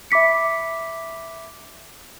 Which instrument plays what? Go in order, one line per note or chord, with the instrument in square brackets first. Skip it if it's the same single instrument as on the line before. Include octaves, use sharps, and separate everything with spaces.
[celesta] E5 B5 D6 B6 C#7